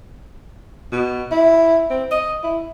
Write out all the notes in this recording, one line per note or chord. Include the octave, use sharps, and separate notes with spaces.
B2
E4
C4
D#5
E4